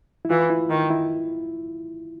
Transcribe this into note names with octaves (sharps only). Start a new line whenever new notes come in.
E4
E3 F4
E4
D#3
E4